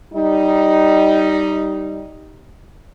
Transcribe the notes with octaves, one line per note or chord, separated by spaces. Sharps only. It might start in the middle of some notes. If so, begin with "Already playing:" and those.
G3 D#4